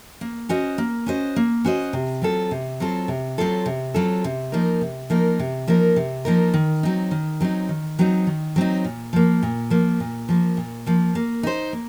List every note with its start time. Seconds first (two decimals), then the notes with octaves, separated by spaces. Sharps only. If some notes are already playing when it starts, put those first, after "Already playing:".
0.21 A#3
0.49 C#4 F#4 C5 D#5
0.78 A#3
1.06 C#4 F#4 C5 D#5
1.36 A#3
1.64 C#4 F#4 C5 D#5
1.93 C3
2.22 F#3 C4 F4 A4
2.51 C3
2.80 F#3 C4 F4 A4
3.08 C3
3.38 F#3 C4 F4 A4
3.66 C3
3.94 F#3 C4 F4 A4
4.24 C3
4.52 F3 A#3 D#4 A#4
4.81 C3
5.10 F3 A#3 D#4 A#4
5.39 C3
5.68 F3 A#3 D#4 A#4
5.96 C3
6.25 F3 A#3 D#4 A#4
6.54 D#3
6.83 F#3 C4 D#4
7.11 D#3
7.41 F#3 C4 D#4
7.69 D#3
7.99 F#3 C4 D#4
8.27 D#3
8.56 F#3 C4 D#4
8.84 A#2
9.13 F3 A#3
9.43 A#2
9.70 F3 A#3
10.00 A#2
10.29 F3 A#3
10.57 A#2
10.86 F3 A#3
11.15 A#3
11.43 D#4 F#4 C5
11.73 A#3